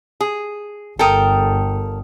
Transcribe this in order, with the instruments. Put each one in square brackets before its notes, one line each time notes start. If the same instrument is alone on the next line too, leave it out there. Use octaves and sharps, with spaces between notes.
[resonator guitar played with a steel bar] G#4
[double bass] G1 [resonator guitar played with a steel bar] A4 A#4 [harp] G5 D#6